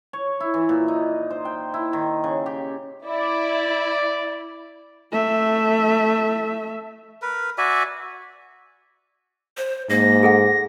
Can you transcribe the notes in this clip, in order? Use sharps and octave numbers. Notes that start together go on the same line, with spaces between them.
C#5
E4
E3
A#2
D#4
C5
G5
E4
D#3
C#3
G4
E4 D5
A3 E5
A#4 B4
F#4 D5 E5 G#5
C5
G#2 A#3 A#6
G#4 A4 F#5